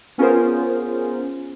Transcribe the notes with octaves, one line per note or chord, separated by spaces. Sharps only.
B3 C#4 F4 G#4 A#4 C5